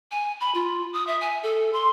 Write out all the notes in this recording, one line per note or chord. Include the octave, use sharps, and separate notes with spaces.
G#5
B5
F4
D#6
E5
G#5
A4
C6